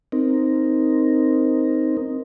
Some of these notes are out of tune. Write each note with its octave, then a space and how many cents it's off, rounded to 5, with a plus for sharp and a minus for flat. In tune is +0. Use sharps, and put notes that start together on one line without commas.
C4 +0 D#4 +0 A#4 +0